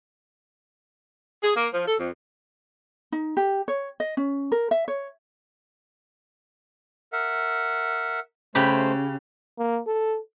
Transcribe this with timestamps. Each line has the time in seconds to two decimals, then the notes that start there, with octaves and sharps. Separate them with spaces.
1.42 G#4
1.55 A#3
1.74 F3
1.86 A4
1.99 F2
3.12 D#4
3.37 G4
3.68 C#5
4.00 D#5
4.17 C#4
4.52 A#4
4.71 E5
4.88 C#5
7.13 A#4 E5 F#5
8.55 C#3 A3 G4 C5 B5
9.59 A#3
9.87 A4